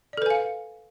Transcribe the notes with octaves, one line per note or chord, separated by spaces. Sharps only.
A4 B4 D5 F5 G#5